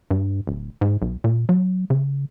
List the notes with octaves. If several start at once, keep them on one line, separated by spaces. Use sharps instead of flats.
G2
D1
G#2
B1
A#2
F#3
C#3